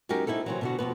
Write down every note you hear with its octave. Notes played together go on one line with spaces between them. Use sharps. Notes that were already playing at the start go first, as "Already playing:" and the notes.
F#2 G#3 D#4 F#4 G4 A#4
C4 D#4 E4 G4 A4
C3 E3 F#3
B2 D3 F#4
F2 G#2 B2 B4